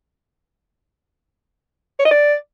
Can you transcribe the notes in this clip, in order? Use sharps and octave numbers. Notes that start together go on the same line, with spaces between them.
C#5
D#5
D5